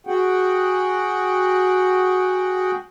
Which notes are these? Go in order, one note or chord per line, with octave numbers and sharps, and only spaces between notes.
F#4 G#4 F#5 G5